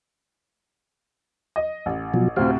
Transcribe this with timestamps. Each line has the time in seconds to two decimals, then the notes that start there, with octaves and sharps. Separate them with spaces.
1.56 D#5
1.86 A1
2.14 B2 F3 F#3
2.36 D2 A2 C3 G4 C5 F5